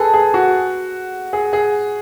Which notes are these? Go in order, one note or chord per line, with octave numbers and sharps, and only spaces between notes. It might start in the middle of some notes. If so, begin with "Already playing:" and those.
Already playing: G#4 A4 B4
G#4
F#4
G#4
G#4